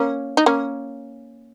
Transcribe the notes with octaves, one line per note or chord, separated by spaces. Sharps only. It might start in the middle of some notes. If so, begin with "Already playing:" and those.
Already playing: A#3 C#4
D#4
A#3 C#4